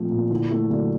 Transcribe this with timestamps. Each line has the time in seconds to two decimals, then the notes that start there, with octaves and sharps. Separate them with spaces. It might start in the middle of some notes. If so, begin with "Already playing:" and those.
Already playing: A#2 F3 A3 C4
0.11 A#2
0.30 D3 E3
0.50 E3 A3
0.70 D3 F#3